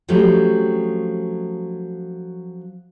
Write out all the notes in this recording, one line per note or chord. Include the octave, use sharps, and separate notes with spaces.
F3 F#3 A3 C4 C#4 G4